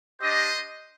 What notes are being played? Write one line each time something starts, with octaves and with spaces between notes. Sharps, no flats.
D4 G4 C5 D#5